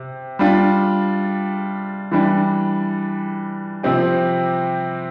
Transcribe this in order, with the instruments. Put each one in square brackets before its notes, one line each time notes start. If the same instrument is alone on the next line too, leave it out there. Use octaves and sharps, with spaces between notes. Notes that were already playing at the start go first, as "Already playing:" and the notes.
Already playing: [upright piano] C3
G3 D4 F4
E3 G3 D4
C3 F3 C4 G4